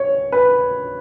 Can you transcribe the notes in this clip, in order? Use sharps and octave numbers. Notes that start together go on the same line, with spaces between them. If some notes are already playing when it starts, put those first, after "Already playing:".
Already playing: C#5
B4